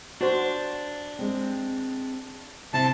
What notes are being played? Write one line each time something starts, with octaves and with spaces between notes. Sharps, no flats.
D4 F#4 C5
G#3 C4
C3 C4 E4 C5 A5